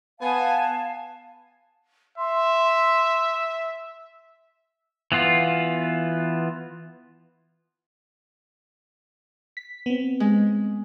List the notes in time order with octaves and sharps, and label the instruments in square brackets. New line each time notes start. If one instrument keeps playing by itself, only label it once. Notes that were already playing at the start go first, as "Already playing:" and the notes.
[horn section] B3 G#5 [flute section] F5 A5
[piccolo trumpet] E5 [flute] C6
[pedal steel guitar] E3 B3 F4
[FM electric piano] B6
B3 C4
[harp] G#3